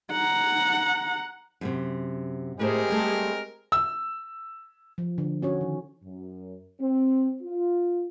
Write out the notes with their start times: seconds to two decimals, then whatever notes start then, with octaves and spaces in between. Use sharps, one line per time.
0.11 F#5 A#5
1.61 F#2 A2 C3
2.59 A2 G#3 A3 C4 G4 G#4 A#4 C5
2.90 G3 A3 A4
3.72 E6
4.98 F3
5.18 D3
5.42 C#4 F#4 C#5
5.61 D#3
6.04 F#2
6.81 C4
7.43 F4